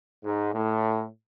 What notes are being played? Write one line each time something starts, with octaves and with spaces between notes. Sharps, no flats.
G#2
A2